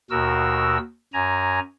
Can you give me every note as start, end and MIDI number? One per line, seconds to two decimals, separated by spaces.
0.10 0.78 39
0.10 0.78 47
0.10 0.78 66
0.10 0.78 70
0.10 0.78 88
1.13 1.59 42
1.13 1.59 80
1.13 1.59 82